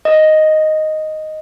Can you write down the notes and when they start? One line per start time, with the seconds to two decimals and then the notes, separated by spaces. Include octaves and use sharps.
0.05 D#5